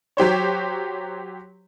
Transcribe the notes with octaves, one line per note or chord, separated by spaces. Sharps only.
F#3 G4 C5 C#5